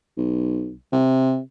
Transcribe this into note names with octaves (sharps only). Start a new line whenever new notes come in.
B1
C3